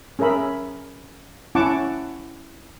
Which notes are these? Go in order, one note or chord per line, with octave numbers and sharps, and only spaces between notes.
C#4 G#4 A#4 E5 B5
C#4 E4 F#5 A5 C#6 D6